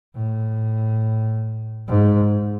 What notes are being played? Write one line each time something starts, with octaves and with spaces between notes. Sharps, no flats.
A2
G#2